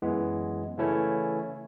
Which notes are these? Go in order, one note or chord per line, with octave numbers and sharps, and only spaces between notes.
F#2 E3 G#3 B3
C#3 E3 A3 C#4 E4